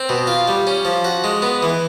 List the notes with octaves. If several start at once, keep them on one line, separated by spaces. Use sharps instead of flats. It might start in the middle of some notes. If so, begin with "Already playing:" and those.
Already playing: C4
B2
F4
G3
C#4
F3
F#4
G#3
B3
E3